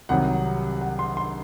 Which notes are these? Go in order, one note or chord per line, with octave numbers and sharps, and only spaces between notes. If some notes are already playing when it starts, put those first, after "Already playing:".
C2 C3 D#3 F#3 F#5
F#5
C6
C6